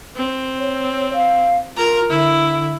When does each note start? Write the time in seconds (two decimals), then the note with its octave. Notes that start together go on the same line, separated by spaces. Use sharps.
0.16 C4
0.59 C#5
1.14 F5
1.77 F4 A#4 A#5
2.10 D3 E4